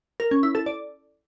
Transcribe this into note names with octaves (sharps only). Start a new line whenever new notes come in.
A#4
C#4
E4
A4
D5